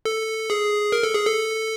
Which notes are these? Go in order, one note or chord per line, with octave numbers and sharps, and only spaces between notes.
A4
G#4
A#4
A4
G#4
A4